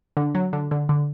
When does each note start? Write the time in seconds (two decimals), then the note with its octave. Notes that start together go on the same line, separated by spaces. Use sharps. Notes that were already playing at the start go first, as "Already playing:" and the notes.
0.17 D3
0.35 F#3
0.53 D3
0.71 D3
0.89 D3